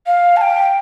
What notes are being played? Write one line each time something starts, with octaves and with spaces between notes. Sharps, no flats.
F5
A5
G5